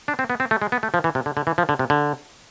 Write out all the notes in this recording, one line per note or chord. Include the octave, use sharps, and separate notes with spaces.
D4
C4
B3
C4
A3
G#3
B3
A3
F3
E3
C3
D3
D3
E3
F3
D3
C3
D3